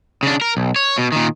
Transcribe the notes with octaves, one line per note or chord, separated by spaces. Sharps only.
C#3 D4
A#4
B1
C#5
B2
A#2 D#3